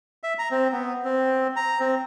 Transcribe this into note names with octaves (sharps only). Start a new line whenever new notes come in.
E5
A#5
C4
B3
C4
A#5
C4